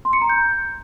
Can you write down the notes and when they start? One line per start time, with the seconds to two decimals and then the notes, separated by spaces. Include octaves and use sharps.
0.05 C6
0.13 C#7
0.21 A#5
0.29 G6